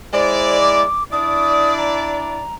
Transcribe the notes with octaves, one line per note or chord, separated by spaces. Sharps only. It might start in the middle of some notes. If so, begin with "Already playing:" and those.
G#3 E4 C5 D5
D6
D4 E4 D5 D#6
A#5